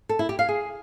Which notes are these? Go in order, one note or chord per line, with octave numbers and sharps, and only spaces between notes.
A4
E4
G4
F5
G#4